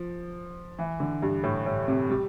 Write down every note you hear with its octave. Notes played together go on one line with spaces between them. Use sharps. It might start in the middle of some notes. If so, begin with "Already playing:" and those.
Already playing: F3
E3
D3
G2
A2
A2
C3
G3